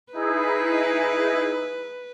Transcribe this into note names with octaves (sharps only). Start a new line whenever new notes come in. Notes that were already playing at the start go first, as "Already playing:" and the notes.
D#4 E4 G#4 B4